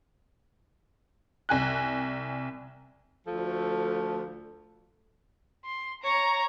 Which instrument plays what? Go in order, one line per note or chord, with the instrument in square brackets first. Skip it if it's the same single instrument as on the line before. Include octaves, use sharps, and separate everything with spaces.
[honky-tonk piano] C2 G#5 F#6
[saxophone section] D2 F3 A3 A4
[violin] C6
C#5 A#5